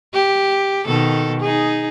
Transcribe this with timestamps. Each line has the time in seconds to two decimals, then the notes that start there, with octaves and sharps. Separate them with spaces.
0.14 G4
0.86 B2 D#3 A4
1.41 D#4 G#4